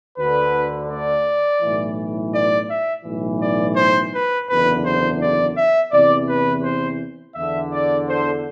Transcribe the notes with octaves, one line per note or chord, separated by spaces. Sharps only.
D2 D3 B4
D5
B1 A2 E3
D5
E5
B1 A2 E3
D5
C5
B4
F#1 E2 D3 B4
C5
D5
E5
E2 C3 E3 D5
B4
C5
E2 D3 E5
D5
C5